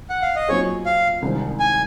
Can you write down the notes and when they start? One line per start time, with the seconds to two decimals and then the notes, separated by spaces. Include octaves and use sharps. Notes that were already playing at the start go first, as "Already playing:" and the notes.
0.10 F#5
0.22 F5
0.36 D#5
0.48 A#2 F#3 C4 D#4 G#4 C#5
0.86 F5
1.22 C2 C3 D#3 G#3 C4
1.60 G#5